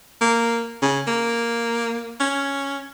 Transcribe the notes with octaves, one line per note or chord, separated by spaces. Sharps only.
A#3
C#3
A#3
C#4